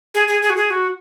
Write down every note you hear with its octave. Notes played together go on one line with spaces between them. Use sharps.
G#4
G#4
G#4
F#4
G#4
F#4